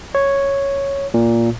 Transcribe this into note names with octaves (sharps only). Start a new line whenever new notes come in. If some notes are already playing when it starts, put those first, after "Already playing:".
C#5
A#2